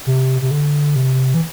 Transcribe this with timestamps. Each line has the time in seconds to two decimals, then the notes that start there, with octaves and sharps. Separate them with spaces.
0.06 C3
0.42 C3
0.51 D3
0.96 C3
1.34 E3